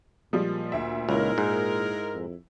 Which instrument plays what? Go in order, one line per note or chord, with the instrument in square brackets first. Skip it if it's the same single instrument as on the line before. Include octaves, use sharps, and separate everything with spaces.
[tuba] A#2 [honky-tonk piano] F3 G3 G#3
[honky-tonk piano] D2 E5
[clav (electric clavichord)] C#2 [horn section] G#3 D#4 A#4 [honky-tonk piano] E4 F7
[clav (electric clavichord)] G#2
[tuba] F2